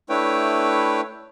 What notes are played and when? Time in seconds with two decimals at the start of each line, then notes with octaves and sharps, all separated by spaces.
0.09 A3 D4 E4 B4 C#5 G5